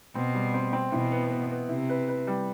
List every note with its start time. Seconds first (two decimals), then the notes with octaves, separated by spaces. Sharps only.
0.15 B2 C4
0.34 G3
0.54 C4
0.73 C4
0.92 B2 E3
1.12 B3
1.31 B3
1.51 B3
1.69 C3 E4
1.89 B4
2.08 B4
2.27 G3